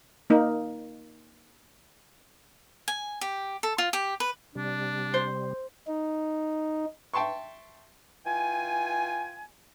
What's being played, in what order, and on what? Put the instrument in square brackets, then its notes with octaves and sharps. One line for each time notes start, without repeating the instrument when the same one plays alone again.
[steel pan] A#3 D#4
[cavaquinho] G#5
G4
A4
F4
G4
B4
[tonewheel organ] C3 G3 [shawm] D4
[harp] C5
[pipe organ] D#4
[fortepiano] E5 G5 A5 C6 C#6
[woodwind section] E3 F4 G5 G#5